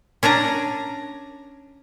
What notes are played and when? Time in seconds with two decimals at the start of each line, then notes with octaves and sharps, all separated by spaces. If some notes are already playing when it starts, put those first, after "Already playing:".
0.23 C#4 D4 G#5 A#5